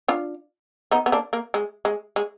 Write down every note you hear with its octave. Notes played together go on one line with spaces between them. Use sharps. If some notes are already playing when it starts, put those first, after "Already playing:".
D4 F4
B3 D#4
B3
A#3 D4
A#3
G#3
G#3
G#3